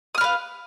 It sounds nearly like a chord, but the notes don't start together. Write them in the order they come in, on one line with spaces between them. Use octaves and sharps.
D#6 F6 B4 F5